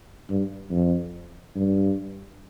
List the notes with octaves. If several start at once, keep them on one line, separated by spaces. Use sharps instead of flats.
G2
F2
G2